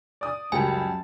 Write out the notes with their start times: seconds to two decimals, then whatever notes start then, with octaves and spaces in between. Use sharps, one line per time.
0.21 D5 D#6
0.52 C#2 F#2 G3 G#3 G4 G#5 A5